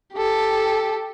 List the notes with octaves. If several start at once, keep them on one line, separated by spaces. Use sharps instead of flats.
G4 A4